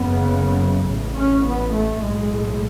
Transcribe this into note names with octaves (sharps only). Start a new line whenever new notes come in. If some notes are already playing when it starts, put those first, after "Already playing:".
Already playing: F#1 F#2 C#3 B3
A1 A2
C#4
B3
A3
B1 A2 G#3